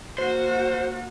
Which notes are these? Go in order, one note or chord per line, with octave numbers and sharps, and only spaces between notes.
A#3 F#4 C5